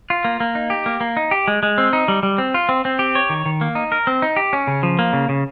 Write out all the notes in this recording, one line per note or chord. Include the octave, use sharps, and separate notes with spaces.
F4
A#3
A#3
D#4
G4
A#3
A#3
D#4
G4
G#3
G#3
C4
D#4
G3
G3
C4
F4
C4
C4
G4
C#5
D#3
D#3
A#3
D#4
A#4
C4
D#4
G4
C#4
C#3
F3
A#3
C#3
C#3